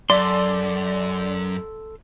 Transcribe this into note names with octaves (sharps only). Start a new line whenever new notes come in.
F#2 A4 D5 C6